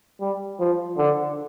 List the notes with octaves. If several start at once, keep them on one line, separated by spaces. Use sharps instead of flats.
G3
F3
D3